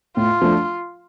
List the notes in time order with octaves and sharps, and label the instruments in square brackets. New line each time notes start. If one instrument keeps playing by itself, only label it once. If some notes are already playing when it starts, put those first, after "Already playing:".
[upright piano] A2 [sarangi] F4
[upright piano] F3 A3 D4